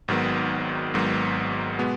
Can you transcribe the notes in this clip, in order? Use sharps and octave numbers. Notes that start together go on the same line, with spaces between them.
G#1 G#2 D#3 F#3 B3
G#1 G#2 D#3 F#3 B3
B2 G#3 B3